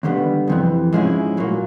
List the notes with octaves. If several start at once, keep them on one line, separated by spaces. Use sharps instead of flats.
D#2 D3 G3 B3
F2 C3 E3
G#2 F3 G#3 C#4 E4
A#2 F#3 A#3